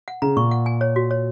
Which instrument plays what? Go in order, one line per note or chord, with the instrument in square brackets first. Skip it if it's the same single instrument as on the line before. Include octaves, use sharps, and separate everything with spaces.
[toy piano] F#5
[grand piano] C#3 [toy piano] A#5
[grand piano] A#2 [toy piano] C#6
[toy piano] F#5
G#5
C#5
F#4
C#5